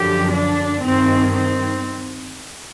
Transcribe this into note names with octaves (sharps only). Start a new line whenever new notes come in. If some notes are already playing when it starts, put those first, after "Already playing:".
Already playing: F#2 D3 F3 G4
D4
G2 D#3 C4
C4